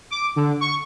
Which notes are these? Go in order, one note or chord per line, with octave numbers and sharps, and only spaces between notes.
D6
D3
C#6